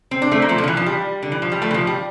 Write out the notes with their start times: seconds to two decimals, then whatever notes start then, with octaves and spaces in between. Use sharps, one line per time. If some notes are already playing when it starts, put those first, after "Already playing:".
0.11 C4
0.22 D4
0.32 A3 C4
0.42 A#3
0.49 F3 A3
0.58 D3
0.63 F3
0.68 E3
0.77 F3
0.86 G3
1.23 D3
1.32 E3
1.42 F3
1.52 G3
1.62 F3 A3
1.71 E3
1.74 F3
1.87 G3